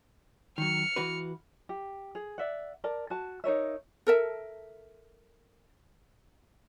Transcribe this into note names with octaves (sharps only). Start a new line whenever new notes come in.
D#3 F#3 F6 C#7
E3 F#4 B4
G4
G#4
D5 E5 F#5
A#4 D5 A5
F#4 A5
D#4 A#4 C#5 E5
A4 A#4 E5